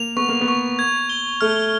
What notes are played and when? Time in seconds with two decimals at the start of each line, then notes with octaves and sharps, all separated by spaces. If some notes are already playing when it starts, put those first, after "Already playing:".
Already playing: A#3 F7
0.16 B3 C#6
0.29 A#3
0.41 B3
0.48 C#6
0.79 G#6
1.09 G7
1.41 A3 F6